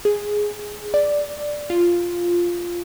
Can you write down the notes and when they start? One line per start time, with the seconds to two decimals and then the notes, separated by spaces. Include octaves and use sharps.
0.05 G#4
0.94 D5
1.70 F4